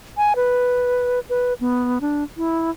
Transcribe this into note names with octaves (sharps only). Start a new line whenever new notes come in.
G#5
B4
B4
B3
D4
E4